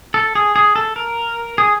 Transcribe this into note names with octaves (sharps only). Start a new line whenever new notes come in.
A4
G#4
G#4
A4
A#4
G#4